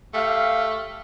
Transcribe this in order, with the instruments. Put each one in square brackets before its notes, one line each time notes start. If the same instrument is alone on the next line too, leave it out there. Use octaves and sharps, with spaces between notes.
[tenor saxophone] A3 [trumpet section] G4 F5